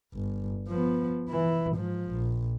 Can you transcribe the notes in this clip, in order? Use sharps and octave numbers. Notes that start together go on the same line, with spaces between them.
G1
F3 B3
E3 E4
G#2 F3
A#1